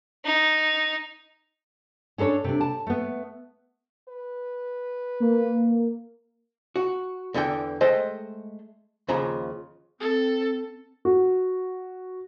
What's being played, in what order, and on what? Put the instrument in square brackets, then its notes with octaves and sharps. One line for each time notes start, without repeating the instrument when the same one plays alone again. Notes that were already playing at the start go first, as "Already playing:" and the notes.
[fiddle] D#4
[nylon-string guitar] C#4 D4 A4 B4 C#5
C3 D4
A5
A3 B3
[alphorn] B4
[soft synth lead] A#3
[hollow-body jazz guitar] F#4
E2 D3 E3 F4 G5
G#3 A3 C5 D#5 G5
D#2 C#3 F3 A#5
[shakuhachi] C4 [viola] A4
[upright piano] F#4